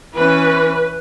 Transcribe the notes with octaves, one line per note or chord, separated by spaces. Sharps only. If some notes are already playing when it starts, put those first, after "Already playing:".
E3 C#4 B4